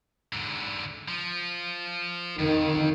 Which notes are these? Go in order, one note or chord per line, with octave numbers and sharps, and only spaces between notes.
G#2 D3
F3
F2 D#3